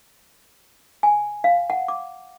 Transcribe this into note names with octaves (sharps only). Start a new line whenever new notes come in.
G#5
F5
F#5
D6